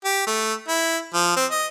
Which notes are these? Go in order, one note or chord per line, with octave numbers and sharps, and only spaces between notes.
G4
A3
E4
F3
C4
D#5